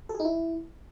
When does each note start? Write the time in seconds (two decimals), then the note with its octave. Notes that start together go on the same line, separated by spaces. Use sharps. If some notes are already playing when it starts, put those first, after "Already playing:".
0.09 A4
0.14 G#4
0.20 D#4
0.25 E4